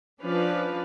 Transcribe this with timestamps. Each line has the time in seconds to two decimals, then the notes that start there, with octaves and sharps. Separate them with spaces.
0.23 F3 C#4 D4 B4 D5 F5